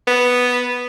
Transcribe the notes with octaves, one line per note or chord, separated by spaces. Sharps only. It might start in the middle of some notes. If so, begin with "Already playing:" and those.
B3